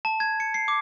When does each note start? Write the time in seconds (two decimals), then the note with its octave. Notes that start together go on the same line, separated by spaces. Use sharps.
0.05 A5
0.20 G#6
0.40 C#7
0.54 C7
0.68 D6